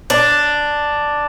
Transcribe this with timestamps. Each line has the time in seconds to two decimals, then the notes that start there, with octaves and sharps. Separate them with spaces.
0.10 D4